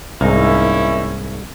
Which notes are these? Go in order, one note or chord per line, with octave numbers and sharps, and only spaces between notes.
C2 G#2 A#3 C#4 D#4 E4